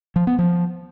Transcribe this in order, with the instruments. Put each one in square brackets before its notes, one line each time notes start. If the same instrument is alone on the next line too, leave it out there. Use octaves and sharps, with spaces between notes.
[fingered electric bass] F3
B3
F3